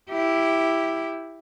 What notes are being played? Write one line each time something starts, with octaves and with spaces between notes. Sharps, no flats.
E4 G4